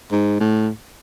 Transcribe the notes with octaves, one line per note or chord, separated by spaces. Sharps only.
G#2
A2